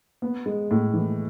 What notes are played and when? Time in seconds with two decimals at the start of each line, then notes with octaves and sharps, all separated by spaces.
0.22 B3
0.46 G#3
0.71 A2
0.94 E3